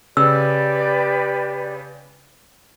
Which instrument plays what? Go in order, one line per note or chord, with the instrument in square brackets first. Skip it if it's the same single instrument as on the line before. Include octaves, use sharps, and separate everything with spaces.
[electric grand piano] C#3 [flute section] G4 B4 D5 [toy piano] E6